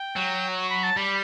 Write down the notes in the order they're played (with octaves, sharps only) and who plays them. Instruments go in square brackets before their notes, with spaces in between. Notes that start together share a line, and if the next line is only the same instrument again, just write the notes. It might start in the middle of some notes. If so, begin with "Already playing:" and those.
Already playing: [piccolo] G5
[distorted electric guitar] F#3
[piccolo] C#6
B5
A5
[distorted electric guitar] G3 [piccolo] B5